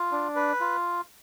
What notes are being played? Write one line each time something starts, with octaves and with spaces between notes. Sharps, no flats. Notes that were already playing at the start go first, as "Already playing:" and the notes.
Already playing: F4
D4
B4
F4